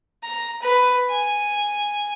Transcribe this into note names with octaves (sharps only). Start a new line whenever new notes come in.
A#5
B4
G#5